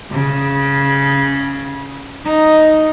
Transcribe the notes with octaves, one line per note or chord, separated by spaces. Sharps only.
C#3
D#4